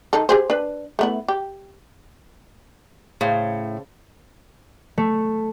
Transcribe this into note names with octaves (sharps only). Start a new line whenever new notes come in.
D#3 D#4 A4
G4 G#4 C5
D4 B4
A3 B3 E4
G4
A2 C#3 C5
A3